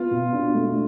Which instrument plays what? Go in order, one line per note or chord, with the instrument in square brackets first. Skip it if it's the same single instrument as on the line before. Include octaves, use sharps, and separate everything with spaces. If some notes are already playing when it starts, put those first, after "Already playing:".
Already playing: [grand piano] B3 [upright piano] F4
[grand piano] B2
D4
A3